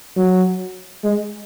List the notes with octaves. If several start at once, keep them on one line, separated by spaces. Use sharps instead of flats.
F#3
G#3